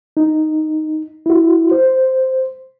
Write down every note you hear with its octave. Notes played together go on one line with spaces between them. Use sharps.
D#4
E4 F#4
C5